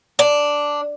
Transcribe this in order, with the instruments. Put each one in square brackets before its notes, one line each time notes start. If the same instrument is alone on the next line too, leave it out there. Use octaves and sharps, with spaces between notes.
[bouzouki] D4